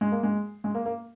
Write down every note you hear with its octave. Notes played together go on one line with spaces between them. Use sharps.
G#3
A#3
G#3
G#3
A#3
A#3